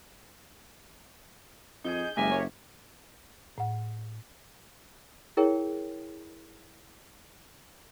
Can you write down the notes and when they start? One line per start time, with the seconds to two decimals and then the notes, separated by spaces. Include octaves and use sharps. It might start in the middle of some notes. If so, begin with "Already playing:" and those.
1.84 F2 D#4 E4 G#4 G6
2.17 F#1 G#3 G4 A#4 E5 G#5
2.31 C#5
3.58 A2 F#5
5.37 E4 G#4 A#4 C#5 G5